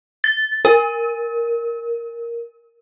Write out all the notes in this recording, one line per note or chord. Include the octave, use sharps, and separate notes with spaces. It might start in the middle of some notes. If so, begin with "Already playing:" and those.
A6
A#4